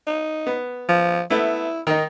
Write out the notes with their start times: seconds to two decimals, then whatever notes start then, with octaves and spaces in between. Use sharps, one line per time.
0.07 D#4
0.47 B3
0.89 F3
1.31 A3 B3 E4
1.87 D#3 D#4